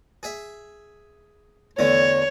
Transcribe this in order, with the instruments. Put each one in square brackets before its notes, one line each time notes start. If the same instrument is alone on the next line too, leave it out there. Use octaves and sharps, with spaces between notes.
[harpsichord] G#4 E5
[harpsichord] E2 D3 A3 [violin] C#5